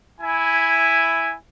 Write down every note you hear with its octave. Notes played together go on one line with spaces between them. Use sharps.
E4 G#5